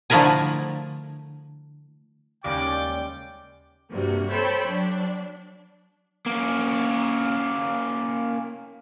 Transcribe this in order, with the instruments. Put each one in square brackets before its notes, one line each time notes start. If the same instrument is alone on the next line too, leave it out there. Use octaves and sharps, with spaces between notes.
[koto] D3 F3 A3 E4 A#4 G#5
[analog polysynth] D#2 C#4 D5 [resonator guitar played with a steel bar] C#3 G3 G#3 [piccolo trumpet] G5 [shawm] D6
[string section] G2 C3 A#3 F#4
A4 C5 C#5 G5 B5 E6
F#3 D4
[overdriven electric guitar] A#3 C#4